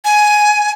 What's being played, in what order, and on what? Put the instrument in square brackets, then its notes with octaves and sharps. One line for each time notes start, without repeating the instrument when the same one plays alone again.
[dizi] G#5